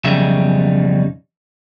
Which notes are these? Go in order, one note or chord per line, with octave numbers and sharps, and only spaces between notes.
B1 F2 C#3 G3 D#4 E5